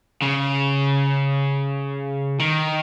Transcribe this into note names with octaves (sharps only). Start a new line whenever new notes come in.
C#3
D#3